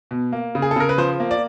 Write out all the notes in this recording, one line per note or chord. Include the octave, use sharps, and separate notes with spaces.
B2
A#3
C#3
G#4
A4
C#3 A#4
B4
F3 C5
A#3
D5